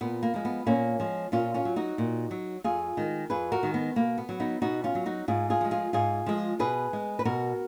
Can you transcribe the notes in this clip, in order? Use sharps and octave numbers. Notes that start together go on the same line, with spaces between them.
A#2 B3
A#3
F3 G#3
B3
A#2 A#3 C#4
F3 G#3
A#2 C#4 F4
C#4 F4
F#3
D#4 F#4
A#2
F#3
F2 F4 G#4
D#3 G#3
F2 G#4 B4
F#4 A#4
D#3 G#3
B3
B2 A#3
B3
F#3
B3 D#4
B2 D#4 F#4
C#4 F4
F#3
D#4 F#4
G#2 F4 G#4
F4 G#4
F3 G#3
F4 G#4
G#2 F4 G#4
F3 G#3
B2 G#4 B4
G#3
B4
B2 F#4 A#4